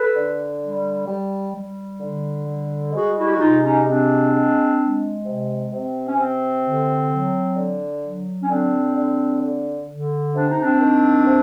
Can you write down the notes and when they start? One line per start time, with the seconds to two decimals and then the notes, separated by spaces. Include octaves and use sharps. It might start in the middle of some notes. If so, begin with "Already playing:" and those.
Already playing: A4 B4
0.15 D3
0.62 G3
1.08 G3
1.54 G3
2.01 D3
2.47 G3
2.93 G#3 F#4 G#4
3.17 E4 F#4
3.24 G4
3.32 F#4
3.39 C3 D#4 F4
3.62 C#4 D#4
3.85 G#3 C4 D4
4.32 G#3
4.78 G#3
5.25 C3
5.71 C3 C4
6.07 C#4
6.17 C3 C4
6.64 D3
7.10 F#3
7.56 D3
8.02 F#3
8.42 C#4
8.48 D3 C4 D4
8.96 D3
9.42 D3
9.88 D3
10.34 C3 D4
10.49 D#4
10.61 C4 D4
10.81 D#3
11.27 C3